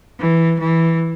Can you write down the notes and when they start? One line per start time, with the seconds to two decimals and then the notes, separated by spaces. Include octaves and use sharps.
0.19 E3
0.59 E3